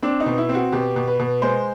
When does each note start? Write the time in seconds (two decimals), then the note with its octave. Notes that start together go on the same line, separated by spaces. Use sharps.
0.02 C4 D4
0.20 D#4
0.26 B2
0.38 E4
0.49 C4
0.55 F#4
0.72 B2 G4
0.96 B2
1.08 B4
1.19 B2
1.42 G#3 C5